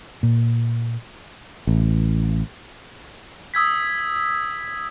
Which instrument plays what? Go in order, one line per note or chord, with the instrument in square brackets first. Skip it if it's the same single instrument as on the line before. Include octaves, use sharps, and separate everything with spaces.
[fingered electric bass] A#2
[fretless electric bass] A1
[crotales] D#6 E6 G#6 B6